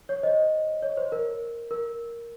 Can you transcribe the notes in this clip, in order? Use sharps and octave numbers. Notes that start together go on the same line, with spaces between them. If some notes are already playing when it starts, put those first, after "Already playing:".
C#5
C5 D#5
C#5
C5
A#4
A#4